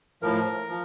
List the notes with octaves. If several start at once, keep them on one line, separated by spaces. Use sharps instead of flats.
A2 F3 A#4
F3